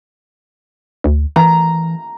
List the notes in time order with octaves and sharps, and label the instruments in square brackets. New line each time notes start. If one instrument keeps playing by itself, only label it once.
[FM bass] D2
[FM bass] E3 [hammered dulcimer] A#5